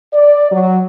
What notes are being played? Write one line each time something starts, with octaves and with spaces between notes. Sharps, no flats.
D5
F#3